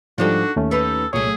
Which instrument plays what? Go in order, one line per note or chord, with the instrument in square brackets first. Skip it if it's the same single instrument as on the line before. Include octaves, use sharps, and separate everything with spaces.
[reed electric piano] G#2 F3 G3 [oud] D4 D#4 A4 [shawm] F#4
[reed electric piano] D#2 A3 C#4
[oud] D#4 G4 B4 [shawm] A4
[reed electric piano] C2 A#2 C#5 [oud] F#3 A3 [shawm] G#4